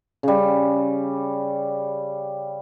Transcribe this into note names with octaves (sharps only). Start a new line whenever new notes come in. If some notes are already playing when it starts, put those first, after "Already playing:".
C#3 G3